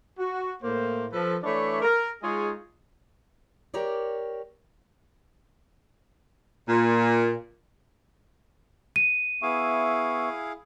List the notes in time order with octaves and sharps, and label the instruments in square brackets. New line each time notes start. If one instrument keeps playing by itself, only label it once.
[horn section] F#4
A2 A#3 C5
F3 A4 B4
E3 A3 D4 C#5 D5 B5
A#4
G#3 D#4 F4 G#4 C#5 D#5
[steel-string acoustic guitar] G4 A#4 C#5 D5
[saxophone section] A#2
[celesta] D#7
[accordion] B3 E5 C#6 [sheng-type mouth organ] E4 G#4 F5